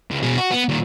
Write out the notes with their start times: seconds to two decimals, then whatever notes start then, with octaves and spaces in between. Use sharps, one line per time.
0.11 C#2
0.23 B2 G#4
0.38 F#4
0.51 B3
0.69 A#2 D#3